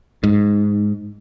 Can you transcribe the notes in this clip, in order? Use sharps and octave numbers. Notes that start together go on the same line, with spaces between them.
G#2